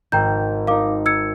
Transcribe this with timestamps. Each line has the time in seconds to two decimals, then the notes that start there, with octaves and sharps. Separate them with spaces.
0.12 G#1 G5 A#5 G6
0.67 D#4 A#4 F5 D6
1.06 E6 G#6 C#7